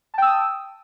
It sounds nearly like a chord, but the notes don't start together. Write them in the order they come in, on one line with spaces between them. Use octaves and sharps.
A5 G5 E6 D#6